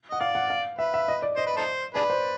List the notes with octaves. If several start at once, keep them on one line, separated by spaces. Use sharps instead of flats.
D#5 F#5
D5 F5
F#5
F5
B4 E5
E5
D#5
D5
C5 D#5
B4
D#4 A4 C5
D4 G#4 B4 D5
C5